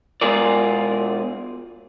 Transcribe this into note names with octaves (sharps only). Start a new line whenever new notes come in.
B2 G#3 F4 G#4 A#4 D5